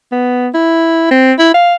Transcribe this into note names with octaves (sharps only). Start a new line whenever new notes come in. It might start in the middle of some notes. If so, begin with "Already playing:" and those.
B3
E4
C4
E4
F5